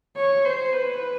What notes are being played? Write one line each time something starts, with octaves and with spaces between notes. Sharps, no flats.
C#5
C5
B4